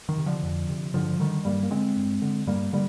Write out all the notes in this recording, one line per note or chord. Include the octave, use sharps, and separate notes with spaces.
D#3
C3
D3 F3
F2
C3
G2 D3 F3
F3
D3 D#3 G3
G2 G3 A#3
A#3
D3 G#3 C4
G2
D3
G2 G3 A#3
D3 G3 A#3